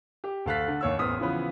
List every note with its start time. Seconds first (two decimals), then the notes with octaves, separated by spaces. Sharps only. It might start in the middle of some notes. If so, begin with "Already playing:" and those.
0.24 G4
0.46 D2 A4 F5 F#6 A6 B6
0.68 D3
0.81 D#2 C#5 E6
0.99 A1 E2 C5 D#6 F6 B6
1.20 C#3 E3 F3 B3 B4